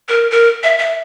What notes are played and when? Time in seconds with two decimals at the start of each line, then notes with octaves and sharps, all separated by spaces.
0.08 A#4
0.31 A#4
0.63 E5
0.79 E5